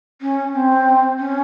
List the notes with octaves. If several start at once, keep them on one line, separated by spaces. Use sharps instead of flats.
C#4
C4
C#4